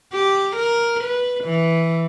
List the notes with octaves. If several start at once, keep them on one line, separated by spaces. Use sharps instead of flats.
G4
A#4
B4
E3